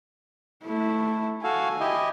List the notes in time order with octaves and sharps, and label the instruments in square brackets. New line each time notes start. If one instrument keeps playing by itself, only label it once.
[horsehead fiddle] A3 E4
[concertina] F#4 A4 F5 [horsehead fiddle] G#5
[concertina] E4 G4 D#5